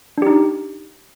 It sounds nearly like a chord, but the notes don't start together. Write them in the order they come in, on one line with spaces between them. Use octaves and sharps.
D4 G4 D#4